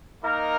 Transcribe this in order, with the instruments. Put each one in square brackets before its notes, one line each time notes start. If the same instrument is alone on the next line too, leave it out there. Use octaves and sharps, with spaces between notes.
[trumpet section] A#3 D#4 A#4